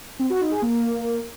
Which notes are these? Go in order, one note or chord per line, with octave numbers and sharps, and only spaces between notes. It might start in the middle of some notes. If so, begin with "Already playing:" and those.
C4
F#4
D#4
G#4
A#3